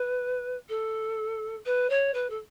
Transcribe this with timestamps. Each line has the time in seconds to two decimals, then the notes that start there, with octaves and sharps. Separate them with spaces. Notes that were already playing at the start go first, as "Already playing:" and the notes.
Already playing: B4
0.68 A4
1.65 B4
1.89 C#5
2.13 B4
2.29 A4